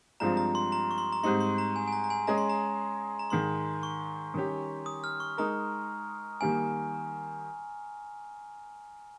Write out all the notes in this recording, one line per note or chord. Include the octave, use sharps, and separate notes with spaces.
G2 F3 G#3 C4 F4 A#5
A#5
C6
A#5
C#6
C6
A#5
G#2 G3 C4 D#4 C6
C6
A#5
G#5
G#5
A#5
A#5
G#5
G#3 C#4 G#4 D#5 A#5
C6
A#5
A#5
G#2 D#3 G#3 C6
C#6
D#3 G3 C#4 G4
D#6
F6
C#6
G#3 D#4 A#4 A#5
D#3 G3 A#3 G#5